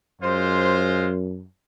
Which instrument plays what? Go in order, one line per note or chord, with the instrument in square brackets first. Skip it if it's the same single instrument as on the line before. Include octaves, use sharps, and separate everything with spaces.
[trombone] F#2 [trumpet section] G#3 F4 C5